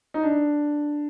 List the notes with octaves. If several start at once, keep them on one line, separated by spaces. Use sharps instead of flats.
D#4
D4